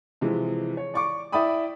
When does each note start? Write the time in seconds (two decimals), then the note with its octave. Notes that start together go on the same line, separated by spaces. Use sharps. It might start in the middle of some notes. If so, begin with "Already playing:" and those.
0.21 C3 E3 F3 G#3
0.77 C#5
0.94 D5 C#6 D6
1.32 E4 D5 E5 G5 B5 D#6